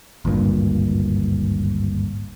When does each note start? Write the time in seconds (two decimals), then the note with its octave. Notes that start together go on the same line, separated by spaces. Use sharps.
0.25 G#1 D2 G2 A#2